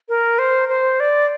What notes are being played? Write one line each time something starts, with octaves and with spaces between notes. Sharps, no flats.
A#4
C5
C5
D5